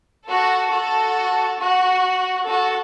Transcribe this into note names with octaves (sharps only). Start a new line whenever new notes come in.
F#4 A4
F#4 A4
F#4
F#4 A4